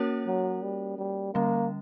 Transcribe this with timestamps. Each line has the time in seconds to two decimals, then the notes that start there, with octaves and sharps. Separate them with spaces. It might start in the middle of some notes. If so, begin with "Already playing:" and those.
Already playing: A#3 C#4 F#4 A#4 C#5
0.27 F#3
0.62 G3
0.98 G3
1.35 D3 G3 A#3 C#4